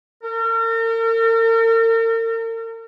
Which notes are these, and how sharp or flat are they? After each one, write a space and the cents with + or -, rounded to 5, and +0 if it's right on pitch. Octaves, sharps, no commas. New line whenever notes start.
A#4 -40